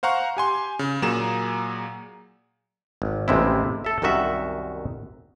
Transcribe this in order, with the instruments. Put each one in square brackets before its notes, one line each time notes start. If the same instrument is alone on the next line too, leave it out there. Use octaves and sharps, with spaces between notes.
[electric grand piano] C5 F5 F#5 A#5 C#6
G4 G#5 C6
C#3
A#2 F#3 A#3 G#4 A#5 E7
[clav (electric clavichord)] G#1
A1 D#2 C3 G#3 E4
A4 E5
C2 F#2 D#3 F#4 E5